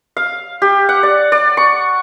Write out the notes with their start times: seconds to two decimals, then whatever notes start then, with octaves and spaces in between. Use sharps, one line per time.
0.17 F5
0.62 G4
0.89 F#5
1.03 D5
1.32 D5
1.57 C#6